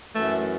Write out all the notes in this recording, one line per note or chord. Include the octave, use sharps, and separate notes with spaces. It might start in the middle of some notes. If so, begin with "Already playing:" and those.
F#2 E3 A3